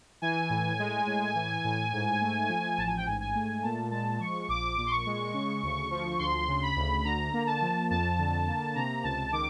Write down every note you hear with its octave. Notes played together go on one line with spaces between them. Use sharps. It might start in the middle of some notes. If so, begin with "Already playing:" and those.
E3 G#5
A2
G#3
A2
E3
A2
G#2
A3
F3
A1 A5
G#5
G5
G#2 G#5
G#5
A3
A#2 A5
G#3 A5
F3 C#6
A#1 D6
A#2
C6
C#6
G#3
C#3
D2
F3
D2 C6
C#3
B5
D2
D3 A#5
A#3
A5
F3
F2 A5
D3
A#3
C3 A#5
C#2 A5
D#3 D6